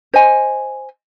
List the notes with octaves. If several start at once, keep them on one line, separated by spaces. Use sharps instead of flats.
C5 D#5 G#5